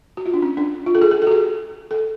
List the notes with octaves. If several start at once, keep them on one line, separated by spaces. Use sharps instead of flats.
F#4
F4
D4
C#4
D4
F4
A4
G#4
A4
A4
F#4
G#4
A4